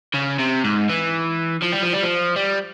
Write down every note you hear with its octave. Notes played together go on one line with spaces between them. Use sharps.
C#3
C3
G#2
E3
F3
G3
F3
G3
F3
G3